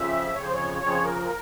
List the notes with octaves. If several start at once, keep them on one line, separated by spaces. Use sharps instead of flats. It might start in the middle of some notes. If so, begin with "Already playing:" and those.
Already playing: F2 C#3 F3 E5
F2 C#3 F3 C#5
C5
C#5
F2 C#3 F3 C#5
A#4